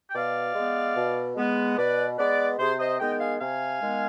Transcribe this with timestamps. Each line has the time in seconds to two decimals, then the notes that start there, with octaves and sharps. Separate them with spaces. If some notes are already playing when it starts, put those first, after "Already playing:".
0.09 G5
0.15 B2 D5 F5
0.55 G#3 B3
0.96 B2
1.37 G#3 B3
1.77 B2 B4 D5
2.18 G#3 B3 B4 D5
2.59 C3 G#4 C5
2.79 C5 D#5
2.99 D#3 G#3 B3 D#5 G5
3.20 F5 G#5
3.40 C3 F5 G#5
3.81 D#3 G#3 B3